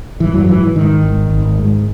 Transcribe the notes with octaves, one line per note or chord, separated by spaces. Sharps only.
G#1 E3
F#2 F#3
G#2 E3
G#2 D#3
G#1
G#1
G#2